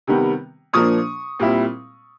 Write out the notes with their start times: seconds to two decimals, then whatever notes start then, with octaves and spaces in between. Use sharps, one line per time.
0.07 C3 D#3 G3 B3
0.73 A#2 F3 A#3 D4 C#6 D#6
1.40 A#2 G3 C4 E4